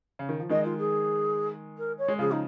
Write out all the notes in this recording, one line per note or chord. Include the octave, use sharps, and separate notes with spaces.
C#3
D#3
F3
D#3 G#3 D#5
F4
G#4
A#4
C#5
G#3
C#3 F3 G#4
D#4